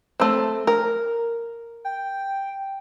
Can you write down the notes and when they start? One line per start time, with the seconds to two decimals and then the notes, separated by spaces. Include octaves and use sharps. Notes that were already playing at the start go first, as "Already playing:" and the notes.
0.20 A3 C4
0.67 A#4
1.85 G5